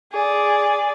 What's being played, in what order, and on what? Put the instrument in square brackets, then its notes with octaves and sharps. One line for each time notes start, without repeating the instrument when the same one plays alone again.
[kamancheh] G#4 D5